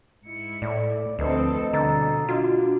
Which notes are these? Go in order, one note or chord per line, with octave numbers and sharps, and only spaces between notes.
G#2 E4 C#7
A2 D5
D2 F3 A3 C4 A4 B4 D#5
B2 D3 G3 A#5 E6 A6
D4 F4 F#4